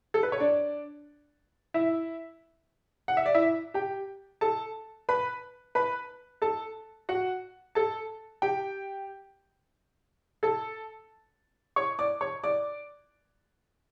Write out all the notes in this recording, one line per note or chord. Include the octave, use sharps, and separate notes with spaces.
A4
B4
C#5
D4 D5
E4 E5
F#5
E5
D5
E4 E5
G4 G5
A4 A5
B4 B5
B4 B5
A4 A5
F#4 F#5
A4 A5
G4 G5
A4 A5
C#5 C#6
D5 D6
C#5 C#6
D5 D6